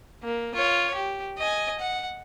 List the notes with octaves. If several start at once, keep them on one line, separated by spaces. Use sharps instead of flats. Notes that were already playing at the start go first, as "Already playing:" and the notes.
A#3
F4 C#5
G4
D#5 G#5
F#5